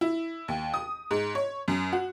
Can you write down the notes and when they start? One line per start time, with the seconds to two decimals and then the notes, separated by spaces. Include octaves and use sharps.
0.01 E4
0.48 D#2
0.74 D#6
1.11 G#2
1.35 C#5
1.68 F#2
1.93 F#4